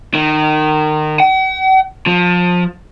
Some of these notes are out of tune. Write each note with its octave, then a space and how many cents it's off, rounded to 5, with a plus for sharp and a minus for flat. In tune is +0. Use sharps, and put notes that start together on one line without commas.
D#3 -25
F#5 +45
F3 +25